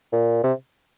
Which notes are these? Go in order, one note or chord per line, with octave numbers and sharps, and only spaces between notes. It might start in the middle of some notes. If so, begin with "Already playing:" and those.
A#2
C3